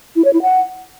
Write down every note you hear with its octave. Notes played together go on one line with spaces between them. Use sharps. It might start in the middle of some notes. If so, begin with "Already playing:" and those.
E4
C#5
E4
F#5